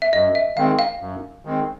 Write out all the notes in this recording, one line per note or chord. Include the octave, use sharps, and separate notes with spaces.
E5
F#2 D#5
E5
D#3 G#3 C4 F5
F5
F#2
D#3 G#3 C4